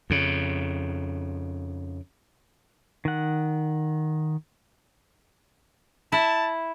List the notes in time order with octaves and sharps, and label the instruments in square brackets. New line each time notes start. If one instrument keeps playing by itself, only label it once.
[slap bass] F2 C#3
[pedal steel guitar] D#3 F#5
[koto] E4 [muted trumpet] A5